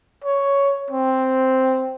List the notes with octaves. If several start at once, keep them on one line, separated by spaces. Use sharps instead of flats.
C#5
C4